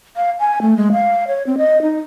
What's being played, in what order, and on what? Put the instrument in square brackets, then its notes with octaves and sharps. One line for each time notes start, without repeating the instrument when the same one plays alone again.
[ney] F5
G#5
A3
G#3
F5
C#5
C4
D#5
D#4